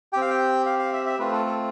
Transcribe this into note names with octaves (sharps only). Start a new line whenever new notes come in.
C4 G4 G5
F5
G5
F5
F5
E5
E5
A3 C4 F4 B4
A4
A4